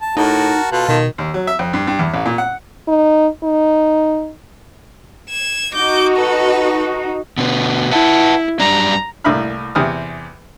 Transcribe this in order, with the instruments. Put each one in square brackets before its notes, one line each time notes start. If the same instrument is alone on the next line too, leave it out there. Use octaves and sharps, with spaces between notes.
[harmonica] A5
[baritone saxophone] A2 [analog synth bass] D#4 [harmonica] F#4 A#4 A5
[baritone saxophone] B2 [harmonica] F4 A4 A5
[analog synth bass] B2 [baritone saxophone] D#3
[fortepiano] D#2
F#3
E5
F2
G2
G2
E2
A1
A#2
F#5
[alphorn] D#4
D#4
[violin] G#6 E7
[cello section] D#4 F#4 [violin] D6 G6
[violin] A4 B4
[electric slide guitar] B2 D3 B3
[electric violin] E4 [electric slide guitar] B4 F#5 A5
[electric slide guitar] F#2 G3 D4 [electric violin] A#5
[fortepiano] C2 A2 A#3 E5 B5 F6
E2 C3 G4 G#5 D#6 F6